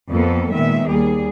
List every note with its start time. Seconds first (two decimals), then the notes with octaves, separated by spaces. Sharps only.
0.10 F2 A#3 B3 A4
0.51 A#2 D#3 G#3 B3 E5
0.87 D#2 G3 G#4